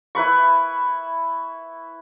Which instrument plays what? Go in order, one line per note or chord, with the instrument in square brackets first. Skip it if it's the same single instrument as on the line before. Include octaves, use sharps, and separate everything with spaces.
[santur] E4 B4 B5 C#6